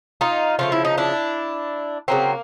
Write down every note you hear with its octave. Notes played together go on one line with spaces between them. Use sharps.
D#4 F4
C#3 F3 A3 F4
E4
D#4
D4 E4
C#3 F#3 A#3 C4